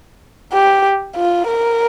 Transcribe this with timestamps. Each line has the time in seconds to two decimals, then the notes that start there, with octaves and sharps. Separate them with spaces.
0.53 G4
1.16 F4
1.47 A#4